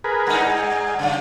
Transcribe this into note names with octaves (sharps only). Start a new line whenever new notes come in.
G#4 A#4 B4
G2 D#4
G#4
F#2 C#3